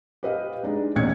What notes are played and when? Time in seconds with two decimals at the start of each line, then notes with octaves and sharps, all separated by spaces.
0.23 G4 B4 D#5 F5
0.63 G#3 D4 D#4
0.96 A1 D#2 B2 G#6 C#7